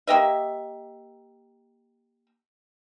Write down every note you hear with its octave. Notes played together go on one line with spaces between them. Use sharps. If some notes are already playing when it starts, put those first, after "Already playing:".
A#3 G4 D#5 E5